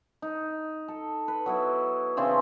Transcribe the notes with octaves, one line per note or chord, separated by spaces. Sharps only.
D#4
A4
B4
F#3 B3 E4
C#3 E3 C4 D4